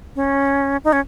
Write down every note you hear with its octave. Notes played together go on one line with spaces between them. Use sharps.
C#4
D#4
C#4